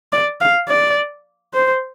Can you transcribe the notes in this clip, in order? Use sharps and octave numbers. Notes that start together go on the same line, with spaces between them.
D5
F5
D5
C5